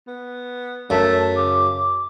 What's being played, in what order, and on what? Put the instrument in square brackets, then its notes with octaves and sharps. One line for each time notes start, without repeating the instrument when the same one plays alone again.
[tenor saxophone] B3
[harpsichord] F#2 [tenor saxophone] A3 [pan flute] A5
[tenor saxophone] C#3 [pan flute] D6